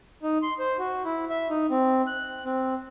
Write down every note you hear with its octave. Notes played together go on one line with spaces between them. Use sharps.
D#4
C6
C5
F#4
E4
E5
D#4
C4
F#6
C4